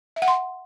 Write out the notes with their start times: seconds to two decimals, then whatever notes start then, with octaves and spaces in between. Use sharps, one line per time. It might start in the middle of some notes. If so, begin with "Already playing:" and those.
0.16 E5
0.22 F#5
0.28 C6